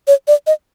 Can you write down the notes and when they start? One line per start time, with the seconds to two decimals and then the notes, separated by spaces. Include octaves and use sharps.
0.07 C#5
0.28 D5
0.47 D#5